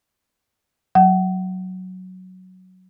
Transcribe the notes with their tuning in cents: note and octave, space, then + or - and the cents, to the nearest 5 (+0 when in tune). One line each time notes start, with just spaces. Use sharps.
F#3 +0 F#5 +35